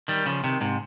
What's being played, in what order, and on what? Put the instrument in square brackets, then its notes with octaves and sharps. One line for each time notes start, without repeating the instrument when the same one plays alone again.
[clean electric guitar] D#3 G3
C#3 F3
C3 D#3
G#2 C3